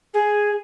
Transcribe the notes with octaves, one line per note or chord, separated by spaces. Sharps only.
G#4